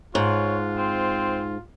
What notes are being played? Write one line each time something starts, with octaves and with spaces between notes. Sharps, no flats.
G#2 F4 C#5
C4